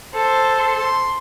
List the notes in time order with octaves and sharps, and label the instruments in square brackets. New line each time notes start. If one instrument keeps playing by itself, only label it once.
[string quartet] A4 C5
[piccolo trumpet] C6